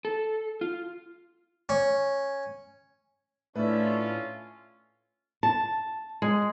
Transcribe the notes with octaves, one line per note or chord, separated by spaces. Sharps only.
A4
F4
C#4
A2 A3 C#4 D4 F4 B4 E5
A5
G#3